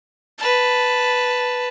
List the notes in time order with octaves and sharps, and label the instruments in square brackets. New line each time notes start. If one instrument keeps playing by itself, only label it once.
[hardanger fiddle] B4 A5